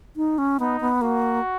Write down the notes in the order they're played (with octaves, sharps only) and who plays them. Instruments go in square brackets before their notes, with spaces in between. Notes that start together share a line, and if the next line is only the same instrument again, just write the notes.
[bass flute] D#4
C#4
[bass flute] B3 [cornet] D#4
[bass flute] B3
[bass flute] A#3 [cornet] F#4